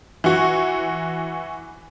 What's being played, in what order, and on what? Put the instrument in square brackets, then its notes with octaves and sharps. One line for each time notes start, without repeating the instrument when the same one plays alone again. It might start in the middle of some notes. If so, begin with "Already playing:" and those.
[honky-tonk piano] E3 F#4